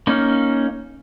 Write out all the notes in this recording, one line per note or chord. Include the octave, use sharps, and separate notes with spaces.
A#3 C#4 D#4